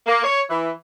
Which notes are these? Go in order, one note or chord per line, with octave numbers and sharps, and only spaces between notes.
A#3
C#5
E3